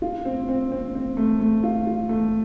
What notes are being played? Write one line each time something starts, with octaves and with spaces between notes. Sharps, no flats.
F4
C4
C4
C4
C4
A3
A3
F4
F4
A3